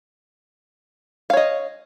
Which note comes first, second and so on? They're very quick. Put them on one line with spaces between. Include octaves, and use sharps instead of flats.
F5 C#5 D#5